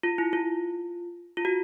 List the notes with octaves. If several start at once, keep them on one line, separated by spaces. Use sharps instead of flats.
F4
E4
F4
F4
F#4